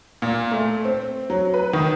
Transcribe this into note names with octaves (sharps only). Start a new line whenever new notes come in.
A#2
A3
C4
F#3
B4
D#3